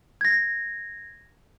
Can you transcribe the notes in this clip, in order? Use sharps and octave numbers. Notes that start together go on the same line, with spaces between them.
G#6 A#6